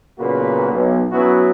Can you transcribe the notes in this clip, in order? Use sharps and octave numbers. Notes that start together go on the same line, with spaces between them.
B1 A#2 C#3 A#3 F#4 B4
B1
F#3 B3 C#4 E4 F#4